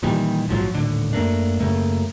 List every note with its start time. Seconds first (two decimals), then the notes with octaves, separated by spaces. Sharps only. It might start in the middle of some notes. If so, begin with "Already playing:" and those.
0.03 A#2 D#3 E3 G3
0.48 A#1 G#2 F3 F#3
0.73 D#1 A2 D3
1.13 F#2 A3 A#3 D4
1.60 F#2 C#3 A3 A#3